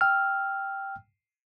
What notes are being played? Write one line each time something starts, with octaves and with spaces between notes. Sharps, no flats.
G5 E6 F6